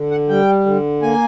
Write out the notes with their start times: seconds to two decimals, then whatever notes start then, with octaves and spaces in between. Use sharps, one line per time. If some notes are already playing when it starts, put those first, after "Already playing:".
Already playing: D3
0.11 F#5
0.29 G3 G5
0.66 D3
1.02 A#3 G#5